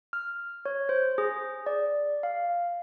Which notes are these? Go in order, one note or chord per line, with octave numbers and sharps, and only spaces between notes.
F6
C#5
C5
G#4
D5
F5